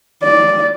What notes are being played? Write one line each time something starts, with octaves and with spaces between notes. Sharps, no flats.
D5